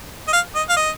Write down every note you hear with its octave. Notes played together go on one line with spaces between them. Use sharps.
D#5
F5
D#5
F5
D#5